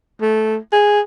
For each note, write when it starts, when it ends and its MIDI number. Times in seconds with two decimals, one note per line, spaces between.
0.21 0.57 57
0.72 1.01 68